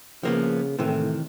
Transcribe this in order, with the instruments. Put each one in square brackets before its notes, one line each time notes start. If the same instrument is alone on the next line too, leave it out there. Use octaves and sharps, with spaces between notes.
[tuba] C#3 [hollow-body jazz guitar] F3 A#3 B3
[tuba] A2 [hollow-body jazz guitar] C3 D#3 E3